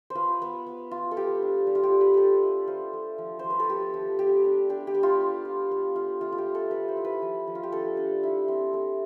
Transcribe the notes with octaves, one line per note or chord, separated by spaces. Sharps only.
C5
F4 B4
B3
B3
F4
A4
F4 G4
D4
G3
F4
G4
G3
B4
D4 A4 B4
A3
F4 C5
A3
F3
C5
F3
B4
A4
B3 G4
F3
B3 G4
D4
D4 G4
G4
B3
F4
F4
F4
B3
F4
A3 F4
F4
G4
A3
A4
A3 B4
C5
E4
B4
F3
F3
F4
G4
D4 A4
D4
E4
C4
A3